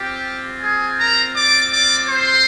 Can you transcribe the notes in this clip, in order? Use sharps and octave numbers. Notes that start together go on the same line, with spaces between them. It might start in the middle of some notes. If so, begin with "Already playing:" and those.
Already playing: C4 F4 G4 G5
G#4 G#5
A#4 A#5
D5 D6
D5 D6
C5 C6